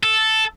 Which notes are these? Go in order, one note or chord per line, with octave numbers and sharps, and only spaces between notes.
A4